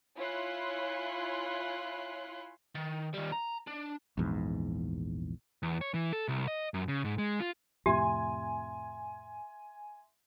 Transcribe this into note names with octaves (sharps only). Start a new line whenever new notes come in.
E4 F4 C#5 G#5 C6 F#6
D#3
D#3 G3
A#5
D4
A#1 E2 G#2
E2
C#5
E3
A4
C2
D#5
F#2
C#3
G#2
G#3
F4
F2 A2 C3 G4 E5 G#5 C6